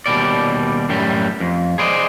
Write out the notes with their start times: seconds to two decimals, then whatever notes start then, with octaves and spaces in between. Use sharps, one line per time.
0.06 D#2 B2 G3 D5
0.89 F#2 A2 G3
1.40 F2
1.78 G#4 C5 D5 D#5